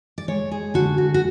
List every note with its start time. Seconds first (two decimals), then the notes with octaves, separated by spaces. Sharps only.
0.18 D5
0.28 G#3 C#5
0.51 G#4
0.74 D3 F#4
0.98 F#4
1.14 F#4